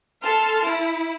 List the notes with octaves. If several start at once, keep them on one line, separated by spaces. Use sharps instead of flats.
A4 A5 C6 F6
E4